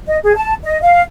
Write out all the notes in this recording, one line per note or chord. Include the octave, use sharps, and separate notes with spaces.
D#5
G#4
A5
D#5
F5